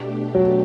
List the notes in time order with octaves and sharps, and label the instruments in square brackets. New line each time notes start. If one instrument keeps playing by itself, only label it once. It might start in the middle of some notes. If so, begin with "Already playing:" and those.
Already playing: [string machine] B2 A3 D4 G4
[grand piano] F#3